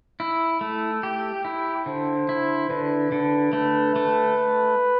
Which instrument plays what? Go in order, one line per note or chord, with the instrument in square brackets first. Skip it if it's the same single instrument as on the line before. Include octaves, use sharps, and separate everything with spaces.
[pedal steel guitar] E4
A3
G4
E4
[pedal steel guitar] D3 [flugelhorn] C5
[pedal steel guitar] E4
[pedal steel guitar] D3 [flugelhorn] B4
[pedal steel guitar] D3
[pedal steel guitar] A3 [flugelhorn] B4
[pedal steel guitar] A3